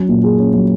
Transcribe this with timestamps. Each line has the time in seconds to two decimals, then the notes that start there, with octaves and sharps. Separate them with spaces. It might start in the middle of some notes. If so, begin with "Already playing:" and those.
Already playing: F#3 C#4
0.09 A#2
0.24 G#4
0.39 C#4
0.54 F#3